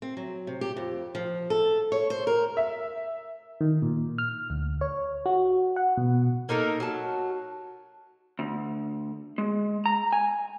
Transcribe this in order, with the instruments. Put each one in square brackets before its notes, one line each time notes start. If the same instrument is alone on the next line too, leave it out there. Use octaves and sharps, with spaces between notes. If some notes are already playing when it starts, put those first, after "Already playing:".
[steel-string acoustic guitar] C4
F#3
C3
G4
F2
F3
A4
C#5
C5
A#4
[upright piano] E5
[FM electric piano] D#3
A#2
F6
D2
C#5
F#4
F#5
B2
[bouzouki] A#3 D#4 A4 A#4
F#3 A5
[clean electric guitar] D2
G#3
A#5
G#5